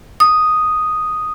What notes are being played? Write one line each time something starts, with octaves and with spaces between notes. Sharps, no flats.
D#6